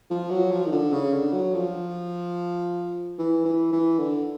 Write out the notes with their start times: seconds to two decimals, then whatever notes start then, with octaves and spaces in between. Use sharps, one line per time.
0.11 F3
0.31 F#3
0.51 F3
0.66 D#3
0.72 D3
0.93 C#3
1.13 D3
1.33 F#3
1.55 F3
3.18 E3
3.45 E3
3.72 E3
3.99 D3